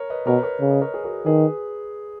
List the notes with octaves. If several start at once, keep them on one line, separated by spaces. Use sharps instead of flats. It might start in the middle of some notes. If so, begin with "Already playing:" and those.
Already playing: A#4 C#5
B4 D#5
B2 A#4 C#5
B4
A#4 C#5
C#3
D#5
A#4 C#5
G#4
F#4 A#4
D#3 G#4 B4